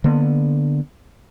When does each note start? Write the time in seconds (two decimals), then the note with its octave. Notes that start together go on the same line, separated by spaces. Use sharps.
0.04 D3 A#3 B3